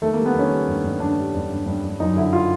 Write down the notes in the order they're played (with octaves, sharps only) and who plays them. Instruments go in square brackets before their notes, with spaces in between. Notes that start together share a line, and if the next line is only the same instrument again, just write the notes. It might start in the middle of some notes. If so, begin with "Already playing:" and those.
[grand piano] D#3 A3
A#3
G3
B3
D#3 C#4
G3
G2
G2
G2 D4
G3
G2
G2
G2
G2
F#2 D#4
D3 E4
F4